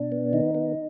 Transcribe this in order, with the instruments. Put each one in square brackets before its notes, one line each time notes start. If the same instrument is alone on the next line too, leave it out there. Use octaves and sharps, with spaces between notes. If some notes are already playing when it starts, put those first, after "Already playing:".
Already playing: [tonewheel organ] B2 D4
B3
D#3 D#4
B3